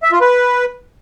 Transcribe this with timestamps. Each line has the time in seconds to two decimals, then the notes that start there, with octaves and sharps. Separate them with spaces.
0.03 E5
0.12 F4
0.21 B4